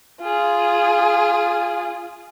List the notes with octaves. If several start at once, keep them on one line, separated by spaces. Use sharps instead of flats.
F4 G#4